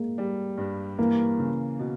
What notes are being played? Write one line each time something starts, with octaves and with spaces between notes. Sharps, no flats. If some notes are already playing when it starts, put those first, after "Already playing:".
Already playing: G#3 A#3
G3
G2
E3 A#3
C#3
B2